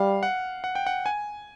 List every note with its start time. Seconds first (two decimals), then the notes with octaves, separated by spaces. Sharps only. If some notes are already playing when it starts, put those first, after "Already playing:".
Already playing: G3 F5
0.23 F#5
0.64 F#5
0.75 G5
0.87 F#5
1.06 G#5